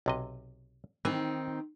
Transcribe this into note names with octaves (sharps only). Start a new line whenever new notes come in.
B1 C3 D#5
D#3 E3 C4 D#4 G#5